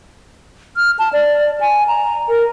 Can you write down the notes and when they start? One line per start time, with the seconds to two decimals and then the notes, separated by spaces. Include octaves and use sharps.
0.77 F6
0.99 A5
1.13 D5
1.61 G#5
1.88 A#5
2.29 A#4